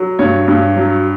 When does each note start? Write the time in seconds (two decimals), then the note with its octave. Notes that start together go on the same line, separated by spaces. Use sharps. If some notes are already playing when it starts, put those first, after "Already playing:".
Already playing: F#3
0.19 G2 C#5
0.48 G2
0.76 F#3